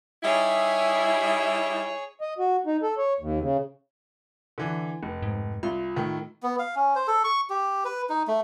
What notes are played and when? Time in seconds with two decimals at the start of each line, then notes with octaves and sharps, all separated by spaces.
0.23 G3 D#4 E4 G#4 C#5 E5
2.21 D#5
2.38 F#4
2.66 D#4
2.83 A4
2.98 C#5
3.20 D#2
3.41 C#3
4.58 D3 E3
5.03 F1
5.23 G#2
5.63 C2 F4
5.96 A2 D#3
6.43 B3
6.59 F5
6.75 C#4
6.95 C5
7.07 A4
7.24 C#6
7.50 G4
7.85 B4
8.10 D#4
8.28 A3